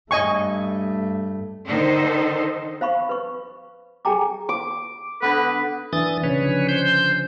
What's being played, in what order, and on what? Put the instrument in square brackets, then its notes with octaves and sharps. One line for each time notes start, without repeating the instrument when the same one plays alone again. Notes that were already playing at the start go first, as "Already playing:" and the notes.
[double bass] G2 A3 [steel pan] D#5 G#5 C#6
[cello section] D3 D#3 D#4 A4 C5 D#5
[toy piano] C5 F5 B5 C#6
B4 C#6
G#4 A4 G5 G#5 A#5 D6
[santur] D6
[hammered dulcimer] D3 B3 [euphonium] A4 [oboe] B4
[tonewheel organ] E3 D#6 A6 [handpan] D4
[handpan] C#3 C#4 [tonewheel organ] B4 C#5
[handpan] D3 F3 D4
[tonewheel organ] C5 G6